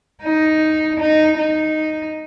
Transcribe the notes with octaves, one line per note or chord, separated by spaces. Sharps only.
D#4
D#4
D#4